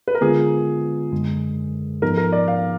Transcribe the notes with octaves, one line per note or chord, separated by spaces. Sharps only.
B4
A#4
D3 G#3 B3 F4 G#4
F#2 D3 G#3
G#2 F3 B3 D#4 A#4
A#4
D5
F5